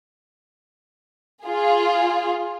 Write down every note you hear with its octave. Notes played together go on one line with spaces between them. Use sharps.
F4 G#4